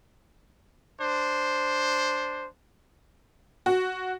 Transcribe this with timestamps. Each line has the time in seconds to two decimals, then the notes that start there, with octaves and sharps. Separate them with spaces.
1.01 D4 C5
3.66 F#4